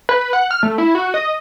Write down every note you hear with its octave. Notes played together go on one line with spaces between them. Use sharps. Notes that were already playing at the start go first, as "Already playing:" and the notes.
B4
F#5
F6
A3
E4
F#4
D#5